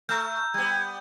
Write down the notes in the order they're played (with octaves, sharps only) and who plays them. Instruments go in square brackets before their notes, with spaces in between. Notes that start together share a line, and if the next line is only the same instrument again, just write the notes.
[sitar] A3 [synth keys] A#5 E6 F6 [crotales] G6
[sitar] G3 B3 [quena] G#6